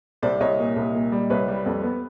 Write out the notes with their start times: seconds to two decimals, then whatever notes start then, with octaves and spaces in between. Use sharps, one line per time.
0.22 C2 C5 D5
0.40 C2 C#5 D#5
0.58 A#2
0.76 C2
0.94 A#2
1.12 G3
1.30 C2 B4 C#5
1.48 G3
1.66 F2
1.84 B3